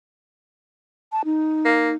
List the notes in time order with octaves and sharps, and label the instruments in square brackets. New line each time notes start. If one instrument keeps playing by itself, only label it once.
[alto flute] A5
D#4
[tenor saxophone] A#3